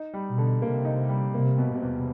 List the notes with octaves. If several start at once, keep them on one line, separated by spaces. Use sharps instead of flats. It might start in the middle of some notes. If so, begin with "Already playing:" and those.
Already playing: D#4
G3
B2
D3
C3 A#3
D#4
G3
C3 A#3
B2
C3
E2